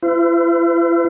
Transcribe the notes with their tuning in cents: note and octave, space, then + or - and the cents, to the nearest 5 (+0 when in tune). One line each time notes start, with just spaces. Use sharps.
E4 +45 C5 -45